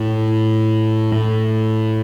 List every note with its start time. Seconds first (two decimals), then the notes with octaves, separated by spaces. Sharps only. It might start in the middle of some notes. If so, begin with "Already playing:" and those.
Already playing: A2
1.12 A2